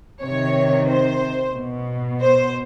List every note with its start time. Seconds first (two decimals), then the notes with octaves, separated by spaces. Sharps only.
0.23 C3 C#5
0.28 D#3
0.88 C5
1.56 B2
2.21 C5